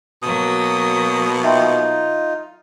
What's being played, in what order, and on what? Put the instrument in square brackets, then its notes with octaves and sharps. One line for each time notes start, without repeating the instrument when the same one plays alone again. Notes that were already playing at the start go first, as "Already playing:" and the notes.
[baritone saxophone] B2 [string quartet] F#3 A#3 [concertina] D#6
[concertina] D#4 F4 [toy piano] E5 G5 C6